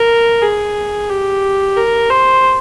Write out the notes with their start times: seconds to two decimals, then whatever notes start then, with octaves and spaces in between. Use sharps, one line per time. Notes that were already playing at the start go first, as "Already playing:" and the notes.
Already playing: A#4
0.42 G#4
1.09 G4
1.76 A#4
2.10 C5